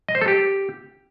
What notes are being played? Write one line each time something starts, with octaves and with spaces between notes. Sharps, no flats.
D#5
C5
A4
G4